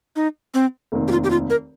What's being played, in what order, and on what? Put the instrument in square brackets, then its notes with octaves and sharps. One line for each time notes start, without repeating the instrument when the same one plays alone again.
[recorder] D#4
C4
[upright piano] F1 D#2 D#3 C4
[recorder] G4
F4
G4
F4
A#4